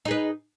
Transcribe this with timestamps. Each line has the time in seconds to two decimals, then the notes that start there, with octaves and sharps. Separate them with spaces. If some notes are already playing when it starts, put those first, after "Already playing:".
0.05 D#4
0.08 G#4
0.11 B4